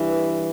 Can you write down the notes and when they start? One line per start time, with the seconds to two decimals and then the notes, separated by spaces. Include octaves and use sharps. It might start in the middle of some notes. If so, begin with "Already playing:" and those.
Already playing: G2 E3